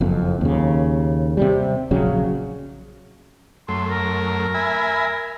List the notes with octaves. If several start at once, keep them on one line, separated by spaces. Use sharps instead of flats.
F#1 F2
D#2 C#3
C3 G3
A#1 C#3 F#3
F#2 A3 C6
A#4
E5 G#5 B5